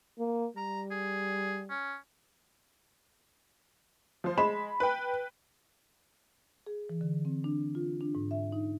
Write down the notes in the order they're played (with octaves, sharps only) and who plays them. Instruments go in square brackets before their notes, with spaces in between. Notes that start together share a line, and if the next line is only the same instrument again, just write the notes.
[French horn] A#3
[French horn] G3 [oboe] A#5
[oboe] G#4
C#4
[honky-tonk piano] F3 C5
[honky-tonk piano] G#3 E7 [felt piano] B5
[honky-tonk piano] B4 G5
[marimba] G#4
E3
D3
C4
D4
F4
D4
G#2
E5
D#4